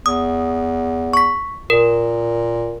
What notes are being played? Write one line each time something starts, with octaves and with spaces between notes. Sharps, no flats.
E2 D#6
C#6 B6
A#2 A#4